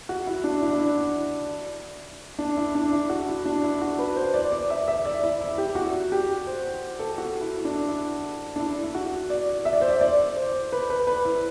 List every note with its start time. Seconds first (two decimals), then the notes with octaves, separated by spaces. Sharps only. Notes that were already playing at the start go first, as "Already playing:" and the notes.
0.09 F#4
0.27 E4
0.44 D4
0.62 E4
0.71 D4
0.79 E4
2.39 D4
2.57 E4
2.75 D4
2.92 E4
3.09 F#4
3.28 E4
3.46 D4
3.64 E4
3.82 F#4
3.99 B4
4.16 C5
4.34 D5
4.52 D5
4.70 E5
4.88 E5
5.05 D5
5.23 E4
5.41 E4
5.58 G4
5.75 F#4
6.12 G4
6.47 C5
6.99 A4
7.18 F#4
7.41 E4
7.65 D4
7.88 E4
8.56 D4
8.60 E4
8.83 E4
8.95 F#4
9.30 D5
9.65 E5
9.73 D5
9.81 C5
9.89 D5
10.01 D5
10.37 C5
10.73 B4
10.90 B4
11.07 B4
11.25 E4